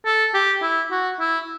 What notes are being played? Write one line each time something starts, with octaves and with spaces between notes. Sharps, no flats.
A4
G4
E4
F#4
E4